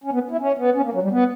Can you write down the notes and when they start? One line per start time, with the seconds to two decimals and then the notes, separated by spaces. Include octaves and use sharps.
0.04 C#4
0.13 B3
0.31 E4
0.40 C#4
0.58 B3
0.75 C#4
0.84 A#3
0.93 F#3
1.02 G3
1.11 B3